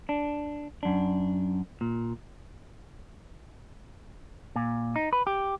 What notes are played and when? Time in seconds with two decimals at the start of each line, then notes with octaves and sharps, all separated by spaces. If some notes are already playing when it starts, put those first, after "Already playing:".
0.09 D4
0.83 F#2 D4
1.81 A#2
4.56 A#2
4.96 D#4
5.13 B4
5.27 G4